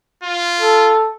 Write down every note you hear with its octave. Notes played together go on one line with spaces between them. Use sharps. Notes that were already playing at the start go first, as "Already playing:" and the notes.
F4
A4